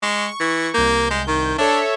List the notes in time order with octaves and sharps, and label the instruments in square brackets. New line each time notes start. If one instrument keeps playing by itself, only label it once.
[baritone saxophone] G#3 [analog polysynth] C#6
[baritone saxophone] E3
[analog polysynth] C2 G6 [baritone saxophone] A#3
[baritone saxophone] G#3
D#3
[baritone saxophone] D4 [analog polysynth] A4 C#5 E5